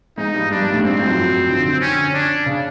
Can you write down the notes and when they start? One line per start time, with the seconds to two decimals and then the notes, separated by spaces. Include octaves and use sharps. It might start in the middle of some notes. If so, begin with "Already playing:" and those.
0.17 G#2 G#3 D#4
0.34 G2 G3
0.51 G2 G3 D4
0.61 G2 G3
0.72 A2 A3
0.83 G#2 G#3 C4
0.99 F#2 F#3
1.08 F2 F3
1.49 D3
1.65 D3
1.81 C#4
2.14 D4
2.46 C#3